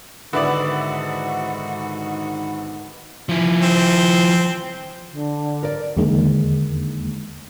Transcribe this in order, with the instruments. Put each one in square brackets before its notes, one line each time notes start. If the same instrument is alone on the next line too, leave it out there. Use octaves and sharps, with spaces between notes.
[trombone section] G#2 D#3 [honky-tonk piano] D3 E4 D5 [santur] B3 [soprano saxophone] F#4
[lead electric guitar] F3 E4
[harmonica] C4
[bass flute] D3
[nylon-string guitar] A#4 D5
[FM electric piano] E2 D3 D#3 G#3 A#3